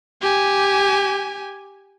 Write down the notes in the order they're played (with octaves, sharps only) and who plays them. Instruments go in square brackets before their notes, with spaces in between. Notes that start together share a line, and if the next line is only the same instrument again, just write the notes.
[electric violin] G4 G#5